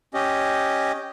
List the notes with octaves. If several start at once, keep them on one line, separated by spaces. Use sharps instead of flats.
C#4 G4 D#5